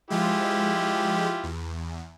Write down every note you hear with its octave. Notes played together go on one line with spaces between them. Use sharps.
F3 G#3 E4 F4 G4
E2